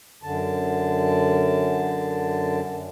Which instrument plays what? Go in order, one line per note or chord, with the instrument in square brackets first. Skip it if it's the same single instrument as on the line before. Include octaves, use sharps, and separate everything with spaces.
[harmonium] F#2 D3 A5